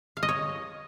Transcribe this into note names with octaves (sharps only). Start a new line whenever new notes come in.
F5
D#5
C#5